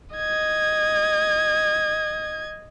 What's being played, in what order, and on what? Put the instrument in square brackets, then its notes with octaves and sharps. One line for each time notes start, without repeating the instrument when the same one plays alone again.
[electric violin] D#5 G#6